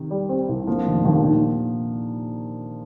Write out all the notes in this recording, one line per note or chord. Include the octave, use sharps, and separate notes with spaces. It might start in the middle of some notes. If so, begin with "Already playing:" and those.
Already playing: C3 D#3
G3
C4
C2
D3 F3 A#3
F1 C3 D#3
A#2
D#2 C3
A#2 D#3